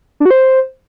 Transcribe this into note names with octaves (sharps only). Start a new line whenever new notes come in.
D4
F#4
C5